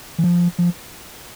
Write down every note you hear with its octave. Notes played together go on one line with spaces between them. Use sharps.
E3
F3
F3